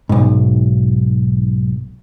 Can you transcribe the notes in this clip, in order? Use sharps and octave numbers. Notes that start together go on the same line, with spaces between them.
B1 G#2